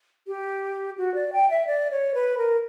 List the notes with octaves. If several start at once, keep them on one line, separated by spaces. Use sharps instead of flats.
G4
F#4
D5
G5
E5
D5
C#5
B4
A#4